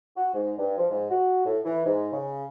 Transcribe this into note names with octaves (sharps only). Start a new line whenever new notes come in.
F#4
G#2
G2
F3
G#2
F#4
A2
E3
G#2
C#3